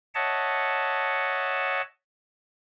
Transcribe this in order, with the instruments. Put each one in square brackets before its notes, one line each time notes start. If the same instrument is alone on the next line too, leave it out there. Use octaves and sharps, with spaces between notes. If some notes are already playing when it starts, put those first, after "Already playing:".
[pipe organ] C#5 D#5 E5 F#5 A5